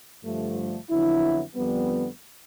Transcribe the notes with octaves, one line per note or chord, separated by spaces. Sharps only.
G2 D3 F3 A3
F2 D3 F#3 B3 E4
F2 D3 G3 B3